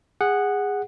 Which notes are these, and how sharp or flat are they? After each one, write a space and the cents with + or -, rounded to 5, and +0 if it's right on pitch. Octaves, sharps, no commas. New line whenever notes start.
G#4 -20 F#5 +0